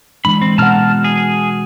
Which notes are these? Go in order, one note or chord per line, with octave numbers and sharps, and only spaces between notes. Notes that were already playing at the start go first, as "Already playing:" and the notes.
E3 G#3 D4 B5
C4
B2 F#5 A5 A#5 F6
G#4